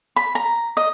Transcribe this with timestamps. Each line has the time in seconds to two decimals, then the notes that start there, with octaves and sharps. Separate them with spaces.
0.16 B5
0.35 A#5
0.77 D#5